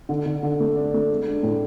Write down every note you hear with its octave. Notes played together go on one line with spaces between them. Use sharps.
D3
D3
D3
A3
D4
A3
G#3
D4
A2